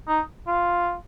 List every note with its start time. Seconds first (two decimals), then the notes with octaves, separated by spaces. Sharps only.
0.08 D#4
0.47 F4